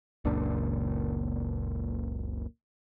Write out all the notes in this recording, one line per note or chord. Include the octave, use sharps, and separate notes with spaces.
F#1 C#2 A#2 D4